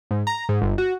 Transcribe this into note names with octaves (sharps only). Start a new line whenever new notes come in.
G#2
A#5
G#2
G1
F#4